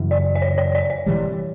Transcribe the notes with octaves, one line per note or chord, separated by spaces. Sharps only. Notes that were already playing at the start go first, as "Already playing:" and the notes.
Already playing: F#2 C#3 E3
D5
D5
C#5
C#5
D5
D5
C3 E3 G3